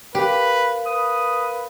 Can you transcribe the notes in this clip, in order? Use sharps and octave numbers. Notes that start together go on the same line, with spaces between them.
G4 A#4 B4 F5
B4 D#6